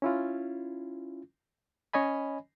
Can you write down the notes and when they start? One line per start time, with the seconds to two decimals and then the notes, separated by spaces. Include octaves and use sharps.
0.02 C#4 E4 F4
1.93 C#4 C#5 D#5 G#5 B5